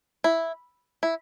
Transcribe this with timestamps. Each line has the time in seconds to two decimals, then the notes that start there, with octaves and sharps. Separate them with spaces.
0.24 E4
1.03 E4